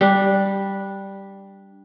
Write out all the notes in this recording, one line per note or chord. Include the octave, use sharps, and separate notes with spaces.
G3 D4